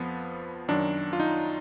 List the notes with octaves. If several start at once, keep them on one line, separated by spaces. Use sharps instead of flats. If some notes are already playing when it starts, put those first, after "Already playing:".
Already playing: F2 F3 B3
F#2 D#3 F#3 D4
F4
D#4